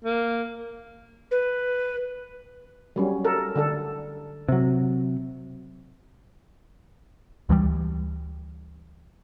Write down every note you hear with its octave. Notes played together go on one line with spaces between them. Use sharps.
A#3
B4
F#3 G3 C#4
A4 A#4
D3 D4 A4
C3 F#3
D2 E3 F3 G3